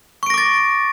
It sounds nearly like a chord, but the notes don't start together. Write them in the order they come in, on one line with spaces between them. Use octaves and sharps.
C#6 D7 A#6 D6 A6